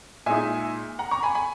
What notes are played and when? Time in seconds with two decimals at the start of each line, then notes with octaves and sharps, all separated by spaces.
0.26 A#2 G#3 D#4 E5 G#5
0.99 F#5 A#5
1.11 A#5 C#6
1.23 G#5 B5
1.35 G#5 B5